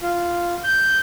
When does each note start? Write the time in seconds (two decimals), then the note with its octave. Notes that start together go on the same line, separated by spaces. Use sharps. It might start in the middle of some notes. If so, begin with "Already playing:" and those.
0.02 F4
0.64 G6